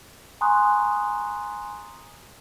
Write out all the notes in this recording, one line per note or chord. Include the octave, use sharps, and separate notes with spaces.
G#5 A#5 C6 C#6 D#6 F#6